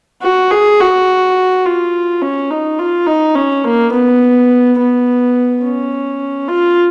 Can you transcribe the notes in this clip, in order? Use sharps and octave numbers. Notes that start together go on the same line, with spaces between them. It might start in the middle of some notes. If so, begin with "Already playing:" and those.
F#4
G#4
F#4
F4
C#4
D#4
F4
D#4
C#4
A#3
B3
B3
C#4
F4